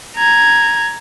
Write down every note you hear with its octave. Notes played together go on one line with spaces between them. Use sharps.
A#5 G#6